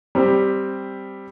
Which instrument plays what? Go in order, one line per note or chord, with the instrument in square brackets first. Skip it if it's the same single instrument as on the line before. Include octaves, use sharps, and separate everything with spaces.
[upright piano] G3 C4 G4